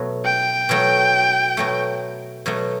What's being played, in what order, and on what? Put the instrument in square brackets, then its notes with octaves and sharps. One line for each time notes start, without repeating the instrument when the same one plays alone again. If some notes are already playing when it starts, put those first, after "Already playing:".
Already playing: [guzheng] B2 F#3 A3
[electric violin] G5
[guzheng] B2 F#3 A3
B2 F#3 A3
B2 F#3 A3